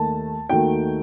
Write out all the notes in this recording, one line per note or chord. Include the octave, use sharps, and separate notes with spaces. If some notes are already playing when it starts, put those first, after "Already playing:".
Already playing: D#2 D#3 A3 A5
D#2 D#3 A3 D#4 F#4 G5